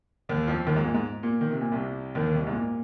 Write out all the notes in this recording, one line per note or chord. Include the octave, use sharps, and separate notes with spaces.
D#2 D#3
F2 F3
D#2 D#3
G#2
A#2
G#2
A#2
D#3
C3
A#2
C2 C3
D#2 D#3
D#3
C2 C3
G#2
A#2